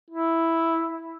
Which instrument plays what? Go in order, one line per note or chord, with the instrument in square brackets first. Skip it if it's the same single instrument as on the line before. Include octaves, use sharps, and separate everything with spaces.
[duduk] E4